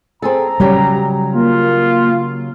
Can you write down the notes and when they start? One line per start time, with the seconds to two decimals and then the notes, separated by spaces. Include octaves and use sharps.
0.22 C4 G#4 A4 A#5
0.60 C#3 F#3 G3 G4
1.33 A#3 F4